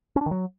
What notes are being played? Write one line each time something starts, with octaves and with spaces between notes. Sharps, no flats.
C#4
D4
D#3
F#3